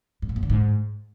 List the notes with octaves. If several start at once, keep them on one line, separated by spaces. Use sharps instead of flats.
G#2
A#2
F#2
D3
G#2